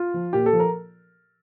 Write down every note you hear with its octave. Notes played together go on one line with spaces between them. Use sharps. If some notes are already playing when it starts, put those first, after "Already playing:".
Already playing: F4
F3
A#2 G4
A4
F3
A#4